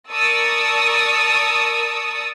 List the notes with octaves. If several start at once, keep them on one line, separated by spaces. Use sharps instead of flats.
A#4 D5 A5 C#6 D#6 E6